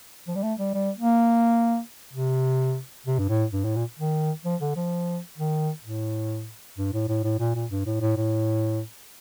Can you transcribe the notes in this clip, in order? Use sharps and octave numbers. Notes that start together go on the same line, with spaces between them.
F3
G3
A3
G3
G3
A#3
C3
C3
G2
A2
G2
A2
A#2
D#3
F3
D3
F3
D#3
A2
G2
A2
A2
A2
A#2
A#2
G2
A2
A2
A2